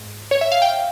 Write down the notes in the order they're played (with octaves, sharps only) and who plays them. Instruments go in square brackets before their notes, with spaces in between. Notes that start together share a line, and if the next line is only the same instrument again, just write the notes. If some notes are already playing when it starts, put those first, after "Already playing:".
Already playing: [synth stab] G#2
C#5
E5
F5
G5